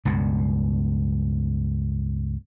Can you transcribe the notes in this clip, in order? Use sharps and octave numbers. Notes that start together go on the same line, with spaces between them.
C#2 G2 B2